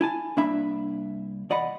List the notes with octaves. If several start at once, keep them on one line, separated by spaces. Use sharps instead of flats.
E4 G#5 A5
C2 A#3 D4 E5 B5
E2 D5 D#5 F#5 B5